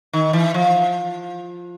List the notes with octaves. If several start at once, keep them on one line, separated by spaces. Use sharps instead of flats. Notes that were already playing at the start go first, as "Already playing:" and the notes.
D#3
E3
F3